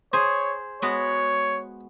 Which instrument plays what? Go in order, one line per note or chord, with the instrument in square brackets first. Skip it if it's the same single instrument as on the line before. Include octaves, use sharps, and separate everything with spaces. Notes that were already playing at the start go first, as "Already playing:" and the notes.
[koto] G#4 [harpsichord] C5 [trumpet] C#5
[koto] G#3 B3 F#4 [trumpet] C#5